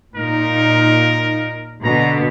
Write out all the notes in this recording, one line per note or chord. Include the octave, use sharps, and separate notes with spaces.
A#2 D#4 A#4
B2 D3 A#5